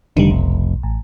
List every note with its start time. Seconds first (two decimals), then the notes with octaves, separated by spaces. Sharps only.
0.17 F1 D3 D#3 G3
0.30 B1
0.83 A1